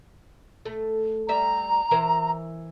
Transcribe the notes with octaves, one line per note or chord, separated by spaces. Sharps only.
A3
G3 E5 A#5
E3 A#4 C5